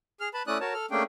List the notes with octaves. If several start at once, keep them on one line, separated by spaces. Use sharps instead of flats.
G#4 F6
B4 A5 B5
A3 C#4 E4 D5 D#6 F#6
F#4 A#4 C#5 A5
A4 F6
A3 A#3 C#4 D4 G#4 G5